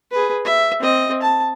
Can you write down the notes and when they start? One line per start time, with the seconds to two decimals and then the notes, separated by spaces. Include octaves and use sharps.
0.11 G#4 B4
0.45 E5
0.79 C4 D#5
1.22 A5